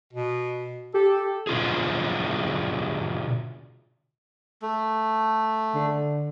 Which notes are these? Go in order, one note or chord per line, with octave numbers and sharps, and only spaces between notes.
B2
G4 A4
B2 D3 F4 G#4
A3
D3